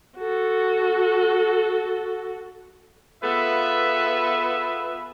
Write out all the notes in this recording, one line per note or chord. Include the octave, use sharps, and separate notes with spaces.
F#4 A4
B3 F4 G#4 A4 B4 E5